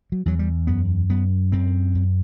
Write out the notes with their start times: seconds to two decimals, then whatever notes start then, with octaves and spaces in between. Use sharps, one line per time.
0.12 F#3
0.26 E2 F#3
0.39 G3
0.67 F#2 B3
1.09 F#2 B3
1.52 F#2 C4
1.95 F#2